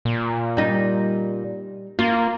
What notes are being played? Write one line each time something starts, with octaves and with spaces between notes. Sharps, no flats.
A#2
G3 D#4
A#3 F4